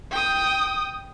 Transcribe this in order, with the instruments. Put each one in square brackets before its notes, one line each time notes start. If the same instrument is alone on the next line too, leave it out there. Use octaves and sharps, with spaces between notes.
[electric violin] G5 D#6